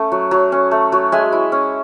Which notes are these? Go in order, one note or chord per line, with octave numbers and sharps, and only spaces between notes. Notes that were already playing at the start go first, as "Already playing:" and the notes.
Already playing: A3 C#4
F#3
F#3
C#4
A3
F#3
G#3 E5 G#5
E4
C#4